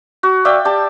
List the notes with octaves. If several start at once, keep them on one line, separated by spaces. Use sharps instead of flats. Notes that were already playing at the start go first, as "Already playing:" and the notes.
F#4
D5 E5 F5 G5
G4 A5